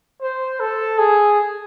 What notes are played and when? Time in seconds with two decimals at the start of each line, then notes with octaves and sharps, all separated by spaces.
0.22 C5
0.60 A4
0.98 G#4